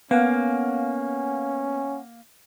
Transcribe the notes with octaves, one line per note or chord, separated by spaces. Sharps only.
A#3 B3 C#4 F5 F#5 G#5